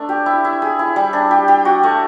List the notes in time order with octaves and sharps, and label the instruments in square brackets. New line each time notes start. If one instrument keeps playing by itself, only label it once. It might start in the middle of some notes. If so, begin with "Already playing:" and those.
Already playing: [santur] A3 D4
G4
E4
E4
G#4
E4
G3
D4
G4
G4
F#4
A3